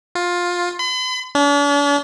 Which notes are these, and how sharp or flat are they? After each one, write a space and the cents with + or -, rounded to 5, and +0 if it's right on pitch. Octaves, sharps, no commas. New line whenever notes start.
F4 +15
B5 +45
D4 -45